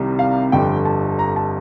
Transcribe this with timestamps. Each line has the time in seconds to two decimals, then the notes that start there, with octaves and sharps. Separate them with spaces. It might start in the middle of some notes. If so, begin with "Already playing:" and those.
Already playing: C2 C3 D#3 G3
0.19 F5
0.52 G1 F2 D3 G3 G5
0.85 A5
1.19 A#5
1.36 A5